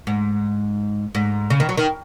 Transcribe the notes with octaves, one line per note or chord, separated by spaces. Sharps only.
G#2
G#2
C#3
D#3
F#3
D#3